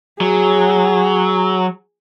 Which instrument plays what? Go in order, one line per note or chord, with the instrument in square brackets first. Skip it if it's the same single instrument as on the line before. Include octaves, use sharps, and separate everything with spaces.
[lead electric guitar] F#3 [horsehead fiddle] G#4